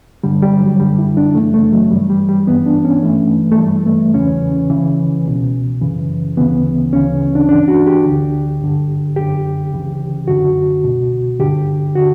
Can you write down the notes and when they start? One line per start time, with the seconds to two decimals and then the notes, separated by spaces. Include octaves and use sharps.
0.24 G2 D3 G3
0.42 G3
0.61 F#3
0.80 F#2 D3 G3
0.99 E4
1.17 D4
1.35 F#2 C#3 E3 A3
1.54 A3
1.73 F#3
1.91 G2 E3 G3
2.10 G3
2.29 G3
2.47 G2 E3 B3
2.66 D4
2.85 C#4
3.03 G2 E3 A3
3.52 A3
3.59 G2 E3 G3
3.86 A3
4.14 E2 C#3 E3 C#4
4.70 C#2 C#3 E3
5.26 C#2 B2
5.81 F#2 C#3 E3
6.37 D2 C#3 E3 B3
6.93 D2 C#3 E3 C#4
7.35 D4
7.49 G2 E3 D4
7.68 F#4
7.87 G4
8.05 D2 D3
8.61 G2 D3
9.16 F#2 D3 G4
9.72 C#2 C#3 E3
10.28 F#2 D3 F#4
10.83 C#2 B2
11.40 G2 D3 G4
11.95 D3 F#4